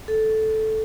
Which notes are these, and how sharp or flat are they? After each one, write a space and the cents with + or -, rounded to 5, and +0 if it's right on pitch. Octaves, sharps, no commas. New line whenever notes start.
A4 -10